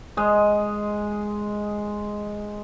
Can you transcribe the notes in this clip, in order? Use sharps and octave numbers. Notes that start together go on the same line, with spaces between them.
G#3 D#5